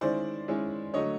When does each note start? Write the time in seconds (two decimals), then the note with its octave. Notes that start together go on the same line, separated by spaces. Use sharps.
0.01 D#3 G#3 C#4 E4 C5 D5
0.48 D#3 G#3 C#4 E4
0.94 D3 F#3 A3 C#5 D#5